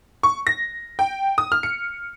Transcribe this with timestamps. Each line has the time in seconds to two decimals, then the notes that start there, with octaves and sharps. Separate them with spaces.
0.23 C#6
0.47 A#6
0.99 G5
1.38 D#6
1.52 F6
1.63 C#7